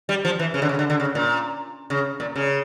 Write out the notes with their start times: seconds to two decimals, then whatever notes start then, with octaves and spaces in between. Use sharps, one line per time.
0.09 G3
0.25 F3
0.39 E3
0.54 C#3
0.62 D3
0.69 C#3
0.79 D3
0.90 D3
1.00 C#3
1.15 A#2
1.90 C#3
2.20 A#2
2.36 C#3